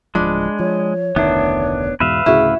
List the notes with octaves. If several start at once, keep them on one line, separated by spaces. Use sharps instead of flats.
D1 G#1 F3 G#3 D4 B5
F3 C#5
F1 D2 D#3 B3 D4 E4
E2 G#2 B2 B4 E5 F5
D2 A2 C#3 E4 F#4 G#4